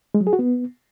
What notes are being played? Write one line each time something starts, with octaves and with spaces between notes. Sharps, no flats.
G#3
F#3
G#4
F#4
B3